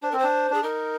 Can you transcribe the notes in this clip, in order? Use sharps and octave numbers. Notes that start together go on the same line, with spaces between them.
D4 C5
C4 A#4
D4 C5
D4 G#4
D#4 A#4